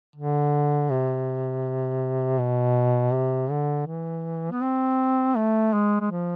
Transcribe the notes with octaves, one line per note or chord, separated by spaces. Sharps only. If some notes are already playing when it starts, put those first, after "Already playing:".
D3
C3
B2
C3
D3
E3
B3
C4
A3
G#3
G#3
F3